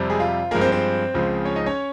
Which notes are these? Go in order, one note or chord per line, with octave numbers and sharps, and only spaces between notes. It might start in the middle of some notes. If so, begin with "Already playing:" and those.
Already playing: F2 C3 G3
G#3 G#4
F4
G2 F3 G#3 A#3 A#4
C4 C5
C4 C5
C#2 C#3 F3 G#3
C#4 C#5
D#4 D#5
C#4 C#5